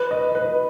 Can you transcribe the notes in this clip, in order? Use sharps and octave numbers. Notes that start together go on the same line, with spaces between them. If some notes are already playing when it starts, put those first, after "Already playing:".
Already playing: B4
D#5
B4